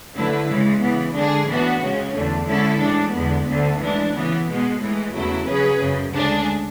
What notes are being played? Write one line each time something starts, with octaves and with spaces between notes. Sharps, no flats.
D3 F#3 A3 E4 B4
C#3 E3 G#3
C#3 E3 B3
D3 G#3 D4 G#4
A2 E3 B3 D4 F#4
C#2 C#3 G#3 C#4
E2 D3 A3
D3 G#3 C#4 E4 A4
A2 E3 G#3 D4
E2 D3 G#3 B3
D2 D3 A3
E3 G#3 D4
C#3 E3 B3
B2 G#3 B3
A2 E3 G#3
E2 C#3 F#3 A3 E4
C#3 F#3 C#4 G#4 B4
F#2 C#3 F#3
D2 C#3 G#3 D4 G#4